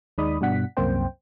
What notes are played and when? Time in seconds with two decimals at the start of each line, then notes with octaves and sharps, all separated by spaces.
0.18 D#2 G#3 D#4 D5 B5 D#6
0.41 G2 B2 D4 F#5 B6
0.77 C2 F#2 A#3 C4 C5 G5